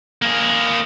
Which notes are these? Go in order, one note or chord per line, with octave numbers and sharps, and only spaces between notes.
A#3 G#4